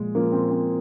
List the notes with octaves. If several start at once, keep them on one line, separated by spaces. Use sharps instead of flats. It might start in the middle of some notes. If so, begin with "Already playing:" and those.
Already playing: A#2 F3 G#3
A#2 F3 A#3
C4
C4